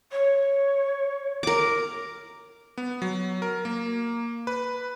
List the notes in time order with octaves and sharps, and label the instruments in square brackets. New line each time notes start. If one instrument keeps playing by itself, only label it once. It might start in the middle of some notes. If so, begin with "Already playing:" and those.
[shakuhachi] C#5
[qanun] A#4 D6
[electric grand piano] B3
F#3
A#4
A#3
B4